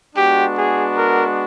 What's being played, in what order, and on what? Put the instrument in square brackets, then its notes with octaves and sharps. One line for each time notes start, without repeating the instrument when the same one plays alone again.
[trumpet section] G#3 B3 D4 F#4 G4
G#4
A#4